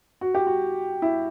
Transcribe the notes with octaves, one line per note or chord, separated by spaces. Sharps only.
F#4
G4
F#4
E4